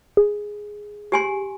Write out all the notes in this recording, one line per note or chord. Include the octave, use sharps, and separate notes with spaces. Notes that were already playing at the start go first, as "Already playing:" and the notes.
G#4
G4 G#5 C6